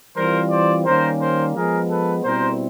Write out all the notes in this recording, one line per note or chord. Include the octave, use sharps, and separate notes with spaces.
E3 G3 C4 F4 A#4 C5
C5 D5
D#3 G3 A#3 C#4 A#4 C5
A#4 C5
F3 G#3 B3 G#4 A#4
A4 B4
B2 G3 C4 E4 A#4 C5